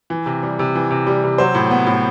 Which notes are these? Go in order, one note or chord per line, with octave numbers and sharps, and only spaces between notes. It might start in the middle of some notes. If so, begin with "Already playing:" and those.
E3
C3
G3
C3
E3
C3
G3
C3
F#3 C5
A2
B3
A2